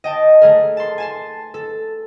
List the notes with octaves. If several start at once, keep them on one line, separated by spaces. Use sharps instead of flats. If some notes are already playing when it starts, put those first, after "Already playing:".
D#5 G5 A5
A3 G#4 A#4
A5 C6
G#5 A5 C6
A4